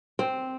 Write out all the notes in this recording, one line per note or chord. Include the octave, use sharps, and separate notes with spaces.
C4